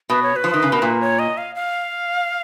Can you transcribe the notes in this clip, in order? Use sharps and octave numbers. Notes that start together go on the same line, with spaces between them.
B2 B4
C#5
B4
F3
D#3
C#3
B2 A#4
A#2 B4
C#5
D#5
F5
F5